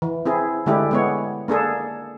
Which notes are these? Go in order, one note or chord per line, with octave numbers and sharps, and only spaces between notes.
E3
C4 E4 G#4
D3 G#3 A3 D4 E4 G4
G#3 B3 C#5
A#3 D4 G#4 A4